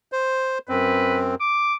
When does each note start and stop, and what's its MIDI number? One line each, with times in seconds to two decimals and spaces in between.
0.12 0.58 72
0.69 1.35 42
0.69 1.35 60
0.69 1.20 71
1.41 1.75 86